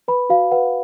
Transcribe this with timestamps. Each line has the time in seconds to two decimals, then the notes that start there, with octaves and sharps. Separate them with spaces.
0.08 B4 B5
0.30 F#4 F5
0.51 B4 F#5